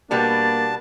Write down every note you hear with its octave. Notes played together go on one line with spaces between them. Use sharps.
B2 G3 A#3 B3 D4 A5